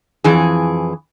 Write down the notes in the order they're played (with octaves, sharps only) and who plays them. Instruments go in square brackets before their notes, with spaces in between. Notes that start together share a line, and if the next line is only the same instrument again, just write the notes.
[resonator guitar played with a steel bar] F2 E3 G#4